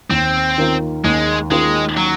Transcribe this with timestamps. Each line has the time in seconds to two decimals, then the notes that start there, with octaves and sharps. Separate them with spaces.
0.10 D#2 C4
0.58 D#3 A#3 F4
1.04 D#2 G#3
1.51 D#3 G#3 A#3 F4
1.97 F#3